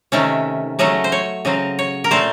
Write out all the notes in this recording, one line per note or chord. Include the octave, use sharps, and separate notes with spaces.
C3 D#3 A3 C#4
C#3 F#3 A3 C#4 D#5
C5
C#5
C#3 F#3 C4 D#5
C#5
A#4
A#2 A3 C4 C5